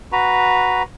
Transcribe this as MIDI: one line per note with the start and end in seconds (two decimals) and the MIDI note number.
0.12 0.83 66
0.12 0.83 71
0.12 0.83 82